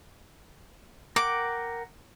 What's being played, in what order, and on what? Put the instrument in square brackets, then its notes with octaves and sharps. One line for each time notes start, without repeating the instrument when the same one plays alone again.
[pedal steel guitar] A#4 F#5 G5 [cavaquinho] D6